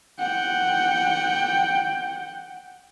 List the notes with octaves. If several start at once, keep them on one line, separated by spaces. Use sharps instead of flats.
F#5 G5